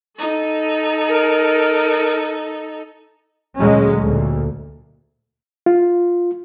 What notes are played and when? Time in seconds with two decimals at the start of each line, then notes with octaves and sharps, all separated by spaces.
0.18 D#4 A4
1.09 A#4
3.58 D2 A#2 F#3 G#3 C#4
4.01 D2 A#2
5.66 F4